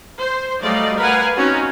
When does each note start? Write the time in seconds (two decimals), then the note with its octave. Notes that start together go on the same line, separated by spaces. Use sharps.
0.22 C5
0.62 F#3 G3 A3 D5 D#5 F5
0.97 A#4 B4 F5 F#5 G#5
1.37 C4 C#4 D#4 F#4